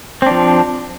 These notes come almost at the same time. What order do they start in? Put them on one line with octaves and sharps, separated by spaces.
C4 D4 F3